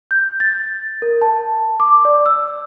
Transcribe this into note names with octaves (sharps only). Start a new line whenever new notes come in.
G6
A6
A#4
A5
D6
D5
E6